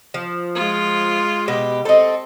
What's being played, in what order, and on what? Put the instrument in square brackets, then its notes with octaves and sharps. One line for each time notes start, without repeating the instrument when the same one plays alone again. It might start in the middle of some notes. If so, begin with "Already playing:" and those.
[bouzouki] F3
[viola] G#3 F4
[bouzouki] B2 [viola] G4
[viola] C4 [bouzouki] A4 D#5